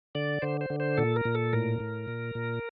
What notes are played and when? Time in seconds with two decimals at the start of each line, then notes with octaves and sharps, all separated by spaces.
0.15 D3 D5
0.42 D3 C5
0.61 C5
0.70 D3
0.80 C5
0.98 A#2 A4
1.16 A#4
1.25 A#2
1.35 A4
1.53 A2 A#4
1.80 A2
2.08 A#2
2.35 A#2